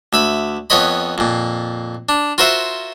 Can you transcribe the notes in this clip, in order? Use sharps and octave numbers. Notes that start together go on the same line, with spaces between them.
D2 E5 B5
F2 B3 C#5 D#5 B5
F2 A#2
D4
F4 F#4 A#4 C5 E5 F#5